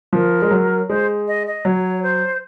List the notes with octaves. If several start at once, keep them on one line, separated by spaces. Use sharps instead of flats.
F3 A#4
G#3
F#3
G#3 C5
D#5
D#5
F#3 C#5
C5